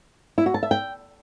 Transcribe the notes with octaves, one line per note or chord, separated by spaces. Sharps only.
E4
F#4
A5
E5
G5